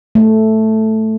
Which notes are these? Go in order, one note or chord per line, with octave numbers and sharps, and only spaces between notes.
A3